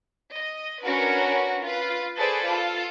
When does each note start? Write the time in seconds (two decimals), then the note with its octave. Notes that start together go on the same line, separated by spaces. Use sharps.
0.34 D#5
0.85 C#4 D4 F#4 A#4 B4
1.65 F4 B4
2.17 G#4 A4 B4 C5 D5
2.46 F4 A4